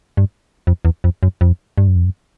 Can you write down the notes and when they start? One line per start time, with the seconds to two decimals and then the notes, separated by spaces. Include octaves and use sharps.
0.17 G2
0.67 F2
0.85 E2
1.04 F2
1.23 F#2
1.41 F2
1.78 G2
1.87 F#2
1.96 F2
2.05 F#2